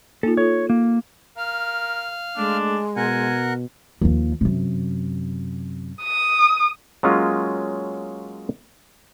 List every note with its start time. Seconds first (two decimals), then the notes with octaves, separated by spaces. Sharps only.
0.23 A#3 D#4 F4 A4
0.37 F4 A4 C#5
0.70 A#3
1.37 A#4 F5
2.37 G#3 A3 D4
2.97 B2 A#4 F#5 G#5
4.01 D#2 F3
4.41 F#2 C3
6.03 D#6
7.03 F#3 G#3 A#3 C#4 F4 D#5